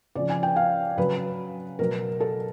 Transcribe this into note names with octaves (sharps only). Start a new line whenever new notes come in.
C#3 F3 D5
G#5
G5
F5
C#3 F#3 B4
B2 F#3 A#4
A4